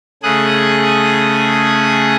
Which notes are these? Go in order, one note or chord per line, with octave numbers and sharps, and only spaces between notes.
C#3 A3 G#4 D#6 F#6